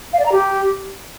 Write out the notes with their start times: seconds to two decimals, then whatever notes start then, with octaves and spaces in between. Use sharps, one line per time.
0.13 F5
0.19 D5
0.26 A#5
0.32 G4